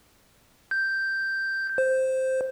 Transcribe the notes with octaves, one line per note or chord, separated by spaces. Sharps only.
G6
C5